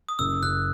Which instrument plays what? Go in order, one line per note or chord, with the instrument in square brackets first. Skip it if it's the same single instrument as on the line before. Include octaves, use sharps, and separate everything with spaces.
[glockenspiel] D#6
[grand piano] F#1 [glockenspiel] E6
[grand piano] F#1 [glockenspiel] F#6